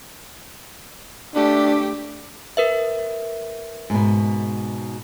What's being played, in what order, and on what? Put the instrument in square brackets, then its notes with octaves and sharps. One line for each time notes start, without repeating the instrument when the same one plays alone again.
[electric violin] A3 G4 [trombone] D4
[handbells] A#4 B4 E5
[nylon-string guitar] G#2 B2